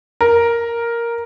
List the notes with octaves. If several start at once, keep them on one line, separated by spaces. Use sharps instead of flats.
A#4